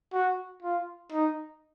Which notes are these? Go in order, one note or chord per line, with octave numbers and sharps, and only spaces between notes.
F#4
F4
D#4